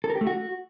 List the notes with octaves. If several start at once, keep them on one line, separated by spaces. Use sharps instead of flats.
A4
A#4
G4
A3
F#4